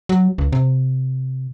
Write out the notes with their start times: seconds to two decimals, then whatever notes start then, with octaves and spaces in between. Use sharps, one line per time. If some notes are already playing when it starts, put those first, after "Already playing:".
0.09 F#3
0.38 C#2
0.52 C3